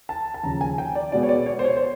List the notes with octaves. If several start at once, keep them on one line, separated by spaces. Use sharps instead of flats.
A5
A5
D#2 C#3 F3 A#5
G#5
G5
D5
B2 G#3 B3 D5
C#5
D5
C#5
C5
C#5
C5